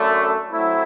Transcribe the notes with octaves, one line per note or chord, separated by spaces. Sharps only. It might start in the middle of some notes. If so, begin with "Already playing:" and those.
Already playing: F#2 D3 A3
F#3 A3 C4 E4